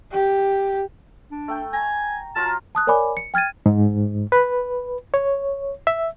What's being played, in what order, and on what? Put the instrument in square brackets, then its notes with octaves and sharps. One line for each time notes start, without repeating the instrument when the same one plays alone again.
[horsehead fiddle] G4
[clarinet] D4
[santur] A3 G5
[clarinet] G#5 [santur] A#5
[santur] F#3 F4 A#4 [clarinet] A5
[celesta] A5 D#6 F#6
A#4 C#5 D5 G#5 B5 D6
C#7
G5 F6 G#6 A6 D#7
[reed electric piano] G#2
B4
C#5
E5